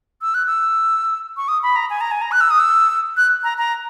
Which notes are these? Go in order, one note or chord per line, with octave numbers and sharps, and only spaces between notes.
E6
F#6
E6
C#6
D#6
B5
A#5
G#5
A#5
G#5
A#5
F#6
E6
D#6
E6
F#6
A#5
A#5